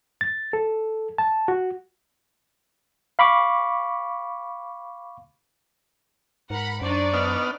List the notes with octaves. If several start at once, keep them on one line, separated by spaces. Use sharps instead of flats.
A6
A4
A5
F#4
F5 B5 C#6 D6
G#2 A#4 F#5 B5
F#2 D4 D#4 C5 D5 C#6
B3 D#5 F6